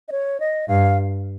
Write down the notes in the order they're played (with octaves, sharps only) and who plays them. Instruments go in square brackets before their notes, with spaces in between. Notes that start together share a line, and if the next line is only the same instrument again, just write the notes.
[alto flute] D#5
C#5
D#5
[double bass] G2 [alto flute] F5